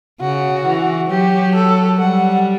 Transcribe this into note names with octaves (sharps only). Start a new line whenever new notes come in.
C#3 F#4
E3
F#3 G4
A4
G3 F#5